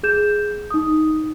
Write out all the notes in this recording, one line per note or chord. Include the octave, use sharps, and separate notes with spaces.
G#4 G6 E7
D#4 D#6